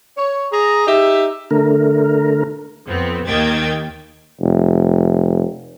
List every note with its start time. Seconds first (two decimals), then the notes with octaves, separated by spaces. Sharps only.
0.17 C#5
0.52 G#4 A#5
0.87 D#4 G4 E5
1.51 D3 A3 A#4
2.87 F2 B3 C4
3.26 D#2 D#3 A#3 G5 G#6 A6
4.41 F1